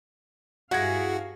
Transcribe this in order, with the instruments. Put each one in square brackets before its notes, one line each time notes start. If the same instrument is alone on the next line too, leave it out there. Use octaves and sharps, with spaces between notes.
[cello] G2 F5 [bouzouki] E4 G#4 [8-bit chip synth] F#4 [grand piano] F#5 G#6 A#6